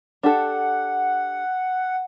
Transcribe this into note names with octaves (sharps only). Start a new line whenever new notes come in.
D4 G4 A4 F#5